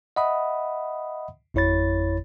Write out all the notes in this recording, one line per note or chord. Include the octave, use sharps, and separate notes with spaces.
D#5 E5 F#5 B5 D#6
G#1 F2 E4 C#5 B5 A6